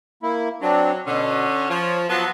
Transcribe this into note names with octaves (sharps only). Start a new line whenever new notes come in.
A#3 E4
F#3 C4 D4
B2 D3 C#4
F3 C#5
F3 F#3 B3 A5 C6